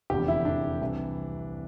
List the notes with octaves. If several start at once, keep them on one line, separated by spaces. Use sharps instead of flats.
F1 E2 D3 G4
E4
F1 E2 D3 D4
C2 C3 E3